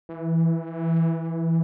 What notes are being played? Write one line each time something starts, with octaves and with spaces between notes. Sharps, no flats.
E3